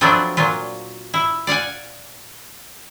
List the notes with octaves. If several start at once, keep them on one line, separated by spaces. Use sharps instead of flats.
F3 F#3 A3 B3 C4 D4
A#2 F#3 F4
E4
D5 F5 F#5 G#5